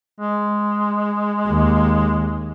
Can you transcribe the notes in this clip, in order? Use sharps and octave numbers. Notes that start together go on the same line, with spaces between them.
G#3
D#2